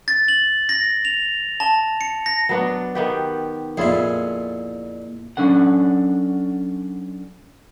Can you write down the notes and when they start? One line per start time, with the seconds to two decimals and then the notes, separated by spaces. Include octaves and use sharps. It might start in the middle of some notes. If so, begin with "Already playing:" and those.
0.08 A6
0.28 F#7
0.69 A#6
1.05 F7
1.60 A5
2.01 C#7
2.26 A#6
2.49 F#3 B3 D4
2.95 D#3 B3 G4
3.77 F2 A#2 E4 F4 G#4
5.37 F#3 C#4 D4 A4 F#5